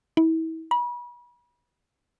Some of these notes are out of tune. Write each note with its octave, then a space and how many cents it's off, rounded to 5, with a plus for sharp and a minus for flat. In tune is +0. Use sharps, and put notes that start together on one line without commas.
E4 -35
B5 -35